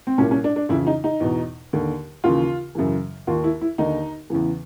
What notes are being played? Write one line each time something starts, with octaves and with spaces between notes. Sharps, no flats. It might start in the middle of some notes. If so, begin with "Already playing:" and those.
C4
C2 A#2 C#4
C#4
D4
D4
F2 C#3 E3 E4
D#4
D#4
E2 B2
D#2 D3
D#2 C#3 E3 F4
F#2 C#3 E3
D#2 D#3 F4
E4
E4
D#2 D3 D#4
E2 C#3 E3